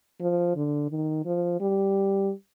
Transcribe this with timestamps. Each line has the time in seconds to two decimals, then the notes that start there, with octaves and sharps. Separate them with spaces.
0.21 F3
0.56 D3
0.91 D#3
1.25 F3
1.61 G3